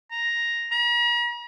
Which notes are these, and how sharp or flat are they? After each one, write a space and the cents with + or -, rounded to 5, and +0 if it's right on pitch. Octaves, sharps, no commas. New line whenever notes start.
A#5 +5
A#5 +45